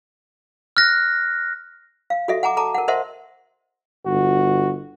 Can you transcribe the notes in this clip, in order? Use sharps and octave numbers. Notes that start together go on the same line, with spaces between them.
F6 F#6 A#6
F5
F#4 A4 D#5 E5
F#5 G#5 A#5 D6
A4 A5 A#5 D6
A#4 F#5
A#4 C5 D#5 E5 F#5 C6
G1 F#4